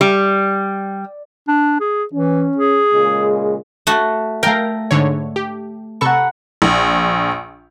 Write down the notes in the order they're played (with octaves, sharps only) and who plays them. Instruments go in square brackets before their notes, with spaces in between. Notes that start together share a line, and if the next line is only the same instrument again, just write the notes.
[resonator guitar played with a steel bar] G3
[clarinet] D4
G#4
[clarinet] E3 [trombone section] C#4
[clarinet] G#4
[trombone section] A#2 C#3 G#3
[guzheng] A3 F#4
[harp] A3 A#6 [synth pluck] A#4 F5 [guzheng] G5
[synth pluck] G#2 D3 C#5
G4
[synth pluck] C3 A4 C#6 [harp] F#5 A#5 B5
[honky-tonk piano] A#1